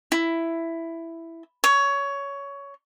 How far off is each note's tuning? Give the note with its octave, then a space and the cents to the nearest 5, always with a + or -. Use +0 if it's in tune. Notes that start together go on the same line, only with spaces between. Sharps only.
E4 +5
C#5 +15